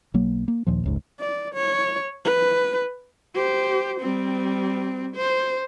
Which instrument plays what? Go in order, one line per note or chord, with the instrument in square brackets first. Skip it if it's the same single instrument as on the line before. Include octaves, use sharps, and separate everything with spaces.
[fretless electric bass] B1 F#3 A#3
A#3
D#2 A#2 F3
F1 C#2 G#2
[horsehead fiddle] D5
C#5
B4
G4 C5
G3 C4
C5